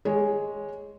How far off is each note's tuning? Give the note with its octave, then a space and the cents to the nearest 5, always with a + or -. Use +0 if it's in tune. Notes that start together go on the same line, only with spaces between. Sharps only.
G#3 +0 G4 +35 C#5 +0